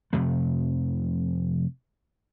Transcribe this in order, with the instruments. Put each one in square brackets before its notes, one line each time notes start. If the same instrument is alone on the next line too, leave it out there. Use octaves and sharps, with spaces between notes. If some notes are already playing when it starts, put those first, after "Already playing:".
[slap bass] F1 F2 C3 A3